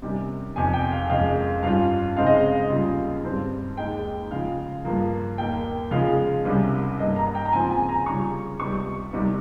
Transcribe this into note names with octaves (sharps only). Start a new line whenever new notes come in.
C3 D#3 G3 C#4
F2 C3 D#3 G#5
G5
F5
F2 D#3 G#3 C#4 F5
G2 G3 C#4 F4 F5
C#3 G#3 C4 D#4 F5
D#5
F5
D#2 C#3 G3 C#4 F4
G2 G3 C4
D#2 D#3 G#3 D#4 G5
C#3 F3 G#3 F5
G2 F3 A#3
D#2 D#3 A#3 G5
C#3 F3 G#3 C#4 F5
C2 C3 D#3 G3 C#4
G2 D#3 A#3 D#5
A#5
G5
A#5
D#2 C#3 F3 C4 G#5
G#5
A#5
C#3 G3 C#4 F4 C#6
C#2 C3 G3 C#6
C2 C3 D#3 G3